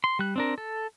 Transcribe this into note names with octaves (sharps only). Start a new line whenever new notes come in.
C6
G3 F#6
C4 D4 A#4
A4